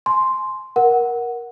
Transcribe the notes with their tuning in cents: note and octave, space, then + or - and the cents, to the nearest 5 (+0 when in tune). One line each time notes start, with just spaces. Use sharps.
G#5 +35 C6 +0
A#4 +15 F#5 +0